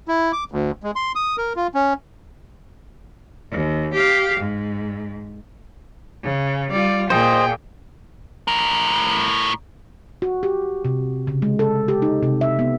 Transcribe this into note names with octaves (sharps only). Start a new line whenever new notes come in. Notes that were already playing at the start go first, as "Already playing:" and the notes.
E4
D6
D2
G#3
C6
D#6
A#4
F4
C#4
D#2
G4 F5
G#2
C#3
G3 F4 D5
A#2 G#4 C5 D#5 G5
A2 A#4
F#4
G4
C3
C#3
G#3
A4
G4
D#4
C3
E5
B3